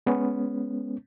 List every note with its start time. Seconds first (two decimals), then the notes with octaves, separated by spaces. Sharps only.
0.06 G#3 B3 C#4